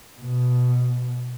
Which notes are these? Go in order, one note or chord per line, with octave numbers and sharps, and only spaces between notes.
B2